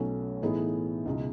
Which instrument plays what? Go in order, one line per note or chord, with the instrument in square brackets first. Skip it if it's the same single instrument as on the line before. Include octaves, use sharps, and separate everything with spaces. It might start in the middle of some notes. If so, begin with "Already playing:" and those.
Already playing: [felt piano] B1 B2 F#3 A3 C#4
A2 E3 B3 D#4 G#4
C#2 B2 G#3 D#4